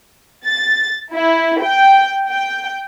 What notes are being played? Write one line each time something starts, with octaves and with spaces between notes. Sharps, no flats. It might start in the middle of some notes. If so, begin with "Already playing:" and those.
A6
E4
G5
G5